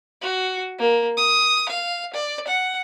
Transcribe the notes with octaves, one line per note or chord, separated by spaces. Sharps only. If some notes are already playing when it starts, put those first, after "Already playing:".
F#4
A#3
D#6
F5
D5
F#5